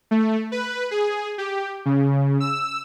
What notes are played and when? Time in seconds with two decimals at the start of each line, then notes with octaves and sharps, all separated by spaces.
0.11 A3
0.52 B4
0.91 G#4
1.38 G4
1.85 C#3
2.40 E6